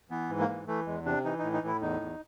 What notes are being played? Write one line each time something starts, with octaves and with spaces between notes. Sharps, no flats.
E3 B3
G#2
A#3
E3
E3 A3
E2 G#3
C3 D4
E3 D#4
A2 D#4
D#4
A2 E4
E2 D#4
E2